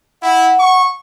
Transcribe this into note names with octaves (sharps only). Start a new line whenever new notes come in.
E4 F#5
C#6